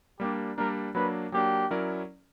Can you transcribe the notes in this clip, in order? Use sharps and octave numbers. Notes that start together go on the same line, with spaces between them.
G3 A#3 D4 G4
G3 A#3 D4 A#4
F#3 A#3 D4 B4
F#3 A#3 D4 G4
F#3 C#4 E4 A#4 D5